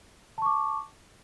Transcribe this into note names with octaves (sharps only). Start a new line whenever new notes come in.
A5 C#6 D6